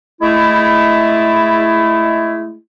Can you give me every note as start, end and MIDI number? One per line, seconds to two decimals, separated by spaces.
0.22 2.55 56
0.22 2.55 57
0.22 2.55 64